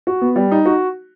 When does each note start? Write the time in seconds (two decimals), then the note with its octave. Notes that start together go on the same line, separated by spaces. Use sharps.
0.07 F#4
0.22 B3
0.36 G3
0.51 D#4
0.65 F#4